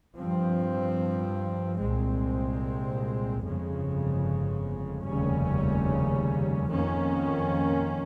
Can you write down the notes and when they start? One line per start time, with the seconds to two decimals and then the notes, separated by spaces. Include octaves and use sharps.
0.17 G2 F3 C4
1.80 C2 A#2 G#3 C4
3.43 G1 F2 C#3 G#3
5.06 F1 D#2 C#3 G3 C#4
6.69 F2 D#3 A#3 C#4